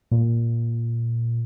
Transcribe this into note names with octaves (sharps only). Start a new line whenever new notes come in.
A#2